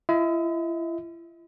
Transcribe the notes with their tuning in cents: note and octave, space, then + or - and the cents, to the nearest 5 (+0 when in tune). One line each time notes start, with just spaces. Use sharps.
E4 +40 D#5 +45